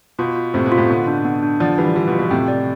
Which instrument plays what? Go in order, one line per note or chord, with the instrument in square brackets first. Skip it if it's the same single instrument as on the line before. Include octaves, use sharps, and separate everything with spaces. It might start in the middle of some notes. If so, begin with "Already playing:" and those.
[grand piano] B2 [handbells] F4
[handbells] F4
[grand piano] A2 C3 [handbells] C5
[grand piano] B2
[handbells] F4
[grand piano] A2 C3
[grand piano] B2 D3 [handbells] B3
[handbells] D4
B3
D4
[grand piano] D3 F3 [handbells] D5
[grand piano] E3 G3 [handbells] B4
[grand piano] E3 G3 [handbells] F4
[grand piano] B2
[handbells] F4
[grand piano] B2
[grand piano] A2 C3 [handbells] G5
[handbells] D5